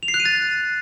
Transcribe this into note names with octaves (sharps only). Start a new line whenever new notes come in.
F7
C7
F#6
D#7
A6